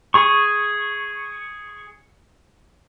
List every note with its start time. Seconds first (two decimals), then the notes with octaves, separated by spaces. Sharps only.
0.14 G#4 C#6